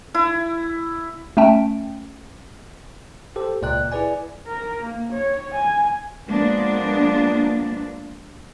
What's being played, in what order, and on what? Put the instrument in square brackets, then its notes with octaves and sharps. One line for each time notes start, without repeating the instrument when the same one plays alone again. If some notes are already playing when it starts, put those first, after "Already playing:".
[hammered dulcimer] E4
[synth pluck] A3 C#4 E5 G5 A5
[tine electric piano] G4 A4 C5
C#2 A#2 D5 G5 F#6
E4 G#4 B4 D5 G#5
[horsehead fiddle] A#4
A#3
C#5
G#5
[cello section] F3 G#3 A#3 B3 D4